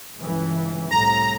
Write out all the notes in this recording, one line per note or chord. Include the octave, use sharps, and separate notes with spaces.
G1 C#2 E3
C2 A2 A#5